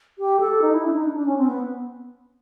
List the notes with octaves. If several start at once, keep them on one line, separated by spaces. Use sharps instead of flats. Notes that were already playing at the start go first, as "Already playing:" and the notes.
G4
A4
D#4
E4
D4
D#4
D4
D4
C#4
C4
B3